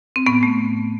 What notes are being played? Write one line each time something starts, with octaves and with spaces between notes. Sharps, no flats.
C4
A2 B3
A3